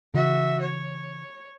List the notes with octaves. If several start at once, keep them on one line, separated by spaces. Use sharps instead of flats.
C#3 E3 F#4 E5
C#5